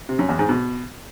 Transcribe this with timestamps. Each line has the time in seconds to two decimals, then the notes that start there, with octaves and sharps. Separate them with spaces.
0.09 C3
0.19 F#2
0.29 E2
0.39 G#2
0.49 B2